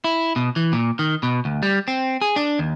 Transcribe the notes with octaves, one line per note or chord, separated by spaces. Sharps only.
E4
B2
E3
A#2
D#3
B2
D2
G3
C4
G#4
D4
D#2